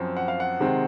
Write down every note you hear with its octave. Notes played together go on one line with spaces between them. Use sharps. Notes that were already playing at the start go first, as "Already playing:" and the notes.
Already playing: F#2 F3 C4
F#5
F5
F#5
C3 D#3 G#3 C4